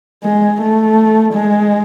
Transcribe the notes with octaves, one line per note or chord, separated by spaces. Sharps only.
G#3
A3
G#3